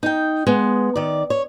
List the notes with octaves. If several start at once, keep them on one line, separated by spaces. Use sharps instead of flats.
D#4 G5
G#3 B3
D#3 D5
C#5